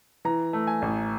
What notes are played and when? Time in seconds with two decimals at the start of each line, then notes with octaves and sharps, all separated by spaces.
0.25 E3 A#5
0.53 A3
0.67 G#5
0.82 A1